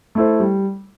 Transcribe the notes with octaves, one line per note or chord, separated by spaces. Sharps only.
A3 E4 A4 C5
G3